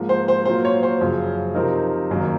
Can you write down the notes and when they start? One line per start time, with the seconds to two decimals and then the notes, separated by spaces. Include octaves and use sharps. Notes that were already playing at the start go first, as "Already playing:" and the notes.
Already playing: G#2 F3 A#3
0.09 C5
0.28 C5
0.45 A#2 F#3 A#3 F4 C5
0.65 C#5
0.83 C5
1.01 F#2 C#3 F3
1.54 C3 F3 C4 D#4 A#4
2.10 F#1 F#2 D#3 A#3